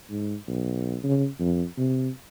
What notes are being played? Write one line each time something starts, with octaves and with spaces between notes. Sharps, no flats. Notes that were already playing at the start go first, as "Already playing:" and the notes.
G#2
B1
C#3
F2
C3